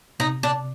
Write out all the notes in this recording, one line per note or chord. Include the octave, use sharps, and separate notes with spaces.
C3 D#4
D4